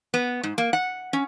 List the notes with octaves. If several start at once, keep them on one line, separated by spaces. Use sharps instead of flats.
B3
G#2
A#3
F#5
C#4